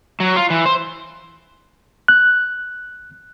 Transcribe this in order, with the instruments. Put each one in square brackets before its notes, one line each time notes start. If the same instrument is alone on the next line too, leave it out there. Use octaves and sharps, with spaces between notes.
[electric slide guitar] F#3
F4
E3
C5
[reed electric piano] F#6